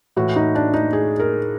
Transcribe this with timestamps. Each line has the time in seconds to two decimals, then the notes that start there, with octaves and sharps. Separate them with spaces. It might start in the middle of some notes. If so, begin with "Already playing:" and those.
0.16 A2 E3 F#4
0.36 D#4
0.55 D4
0.74 D#4
0.93 G#4
1.19 A#4